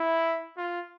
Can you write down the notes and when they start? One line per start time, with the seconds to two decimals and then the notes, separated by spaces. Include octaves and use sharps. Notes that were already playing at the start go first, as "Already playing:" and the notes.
Already playing: E4
0.57 F4